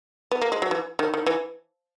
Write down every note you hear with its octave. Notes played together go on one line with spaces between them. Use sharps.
B3
A#3
G#3
F#3
E3
D#3
D#3
E3